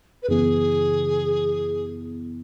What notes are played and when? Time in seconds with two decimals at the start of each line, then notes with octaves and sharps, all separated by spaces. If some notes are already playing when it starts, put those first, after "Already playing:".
0.22 B4
0.29 F#2 C#3 E3 B3 E4 G#4